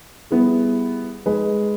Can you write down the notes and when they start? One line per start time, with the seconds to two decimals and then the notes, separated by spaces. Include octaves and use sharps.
0.31 G3 B3 E4 G#4
1.26 G#3 D#4 G#4 B4